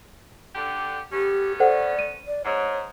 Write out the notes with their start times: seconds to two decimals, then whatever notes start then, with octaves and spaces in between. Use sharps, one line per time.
0.55 D3 G4
1.12 A3 B3 C#4 G4
1.60 A4 C5 D5 F#5
1.99 D#7
2.27 D5
2.45 G#2 C#5